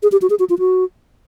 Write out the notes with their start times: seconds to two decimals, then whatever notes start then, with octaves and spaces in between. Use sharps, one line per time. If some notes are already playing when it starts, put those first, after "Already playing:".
0.03 G#4
0.12 G4
0.22 F#4
0.30 G#4
0.39 F#4
0.50 F4
0.59 F#4